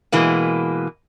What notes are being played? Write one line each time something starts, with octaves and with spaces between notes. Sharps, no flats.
B2 E3 G#3 A#3